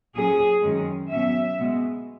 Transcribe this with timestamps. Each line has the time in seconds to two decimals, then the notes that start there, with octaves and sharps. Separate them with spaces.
0.15 A#2 F#3 C#4 G#4
0.63 F#2 D#3 G#3 C#4
1.10 B2 F#3 C#4 E5
1.59 B2 G#3 B3